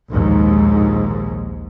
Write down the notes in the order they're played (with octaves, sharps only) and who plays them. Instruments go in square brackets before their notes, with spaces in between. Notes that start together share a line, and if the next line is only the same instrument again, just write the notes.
[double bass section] A#1 D#2 G#2